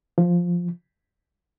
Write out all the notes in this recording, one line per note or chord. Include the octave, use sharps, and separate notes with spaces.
F3